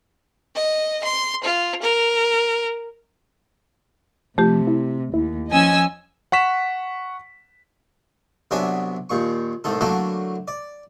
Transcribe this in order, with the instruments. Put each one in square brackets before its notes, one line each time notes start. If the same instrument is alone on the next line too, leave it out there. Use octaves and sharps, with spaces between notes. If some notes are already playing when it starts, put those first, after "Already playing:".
[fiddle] D#5
C6
F4
A#4
[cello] C3 [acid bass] F3 [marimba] A3 G4
[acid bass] E4
[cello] D#2 [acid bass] E4
[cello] F3 C#4 [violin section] D#5 G#5 E6
[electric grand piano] F#5 C#6 B6 E7
[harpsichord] C2 F#3 B3 D4 E5 G#5
D#2 A#2 C#6
C2 A2 D#3 A4
D3 F#3 A3 A#3 E4 A4
D5